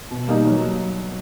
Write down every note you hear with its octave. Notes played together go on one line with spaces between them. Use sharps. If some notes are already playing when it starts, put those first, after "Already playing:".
B2
G3 A#3 D#4
F#3